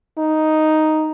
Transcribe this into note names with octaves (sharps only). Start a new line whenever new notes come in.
D#4